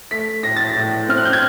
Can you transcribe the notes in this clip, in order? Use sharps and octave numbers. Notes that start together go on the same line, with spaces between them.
A3 B6
A2 A#6
A6
A#6
A2
C4 F6
F#6
G6
G#6